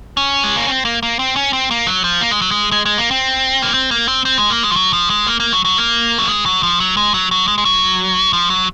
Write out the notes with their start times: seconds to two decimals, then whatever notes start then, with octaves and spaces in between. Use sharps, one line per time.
0.17 C#4
0.44 G#3
0.56 A#3
0.68 C4
0.85 A#3
1.03 A#3
1.19 C4
1.36 C#4
1.53 C4
1.71 A#3
1.87 F#3
2.04 F3
2.21 A#3
2.31 G#3
2.42 F#3
2.51 G#3
2.72 G#3
2.85 G#3
2.98 A#3
3.11 C4
3.62 A#3
3.74 C4
3.91 A#3
4.08 C4
4.25 C4
4.38 G#3
4.50 A#3
4.63 G#3
4.72 F3
4.76 F#3
4.93 F3
5.10 G#3
5.27 A#3
5.40 A#3
5.53 F#3
5.65 F#3
5.78 A#3
6.18 F#3
6.28 G#3
6.46 F#3
6.63 F3
6.80 F#3
6.97 G#3
7.14 F#3
7.31 F#3
7.48 G#3
7.58 G#3
7.65 F#3
8.33 F3
8.50 F#3